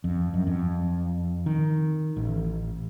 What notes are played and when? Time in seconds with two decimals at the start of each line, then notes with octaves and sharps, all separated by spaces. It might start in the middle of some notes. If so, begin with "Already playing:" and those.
0.04 F2
0.34 F#2
0.47 F2
1.46 D#3
2.16 A1